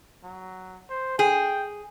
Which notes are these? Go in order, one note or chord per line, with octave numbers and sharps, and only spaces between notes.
F#3
C5
G#4 G5